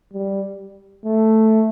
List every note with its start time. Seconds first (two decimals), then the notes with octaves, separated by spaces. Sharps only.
0.14 G3
1.05 A3